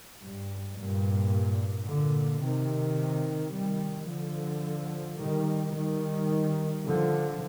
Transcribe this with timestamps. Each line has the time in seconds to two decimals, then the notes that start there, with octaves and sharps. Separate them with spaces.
0.22 G2
0.77 G2 A#2
1.87 A#2 D3
2.42 C3 D#3
3.53 D#3 G3
4.09 D3 F3
5.20 D#3 G3
5.76 D#3 G3
6.86 D3 F3